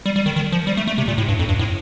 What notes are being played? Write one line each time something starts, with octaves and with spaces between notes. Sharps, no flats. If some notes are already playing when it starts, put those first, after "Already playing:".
G3
G3
D#3
D#3
F3
G3
A3
A3
C3
A#2
A2
G2
F2
G2
A2